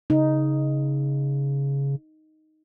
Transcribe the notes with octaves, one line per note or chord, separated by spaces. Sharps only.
C#3 D#4